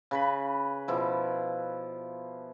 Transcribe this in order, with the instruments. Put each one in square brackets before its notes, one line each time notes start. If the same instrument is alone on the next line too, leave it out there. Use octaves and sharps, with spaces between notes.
[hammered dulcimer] C#3 B4 B5
B2 F3 E4